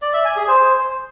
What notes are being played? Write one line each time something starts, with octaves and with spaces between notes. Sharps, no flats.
D5
E5
G#5
G#4
C5